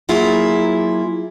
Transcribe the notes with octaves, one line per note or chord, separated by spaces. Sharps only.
F#3 A#3 E4 F4 G#4